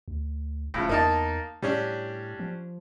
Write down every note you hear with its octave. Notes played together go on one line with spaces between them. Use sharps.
D2
D#1 A2 C#3 F3
E2 A#3 D#4 A5
A2 G3 C#4 D4
F3